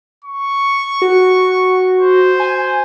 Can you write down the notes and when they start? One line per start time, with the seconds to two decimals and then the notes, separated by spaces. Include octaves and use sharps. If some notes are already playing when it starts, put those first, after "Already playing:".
0.24 C#6
1.02 F#4
2.00 C5
2.40 G#5